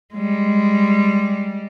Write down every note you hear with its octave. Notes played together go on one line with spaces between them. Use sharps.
G3 G#3